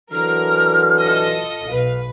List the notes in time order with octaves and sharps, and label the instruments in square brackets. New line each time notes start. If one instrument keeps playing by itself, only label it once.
[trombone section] D3 E3 F#3 [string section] A#4 [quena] F6
[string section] F4 A4 D#5
[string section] B1 B4 [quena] F5